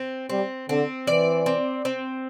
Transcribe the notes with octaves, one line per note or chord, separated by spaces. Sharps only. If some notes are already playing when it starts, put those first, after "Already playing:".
Already playing: C4
G3 C4
D3 C4
E3 D5
C4
C4